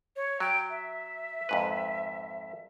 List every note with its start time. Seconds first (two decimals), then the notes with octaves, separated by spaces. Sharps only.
0.16 C#5
0.40 F#3 G5
0.70 E5
1.49 F2 G#2 B4